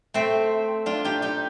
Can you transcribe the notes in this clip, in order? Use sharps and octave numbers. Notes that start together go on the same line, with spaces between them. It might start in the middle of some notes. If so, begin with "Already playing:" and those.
A3 C4
D4 F4
D#4 G4
D#4 G4